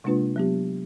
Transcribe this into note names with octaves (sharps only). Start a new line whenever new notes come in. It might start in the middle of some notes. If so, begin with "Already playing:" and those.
C3 G#3 A#3 D4 F4 B4
F#3 B3 G4